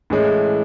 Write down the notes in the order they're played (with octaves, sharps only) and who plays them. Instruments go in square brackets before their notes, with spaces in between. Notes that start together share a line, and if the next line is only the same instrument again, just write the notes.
[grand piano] A2 E3 G#3 C#4